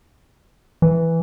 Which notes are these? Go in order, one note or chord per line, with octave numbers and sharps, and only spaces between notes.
E3